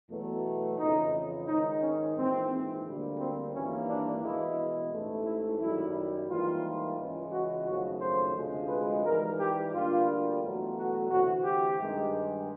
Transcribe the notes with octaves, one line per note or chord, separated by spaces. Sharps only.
E2 B2 F#3 A3
F2 C#3 E3 D#4
G#2 D#3 G#3 D#4
C#4
A#1 G#2 E3 C4
D2 D3 G3 A#3
C4
G#1 G2 E3 G3 A#3 C#4
D4
E2 B2 G#3 E4
A1 G#2 E3 A3
E4
F#2 D#3 G3 E4
G#2 E3 G3 A#3 F4
C#2 C#3 E3 G#3
F#4
G#1 F#2 C#3 F3 A3 F#4
C5
D2 C3 F3 G#3
B4
G#2 E3 G3 A#4
G4
D2 D3 G3 A#3 F4
E2 B2 F#3 A3
F#4
D2 C3 E3 F#4
G4
G2 D#3 G#3